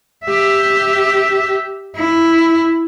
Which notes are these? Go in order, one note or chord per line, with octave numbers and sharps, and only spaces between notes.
G4 E5
E4